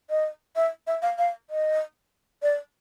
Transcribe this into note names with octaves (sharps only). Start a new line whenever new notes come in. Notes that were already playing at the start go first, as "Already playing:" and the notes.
D#5
E5
E5
F5
F5
D#5
D5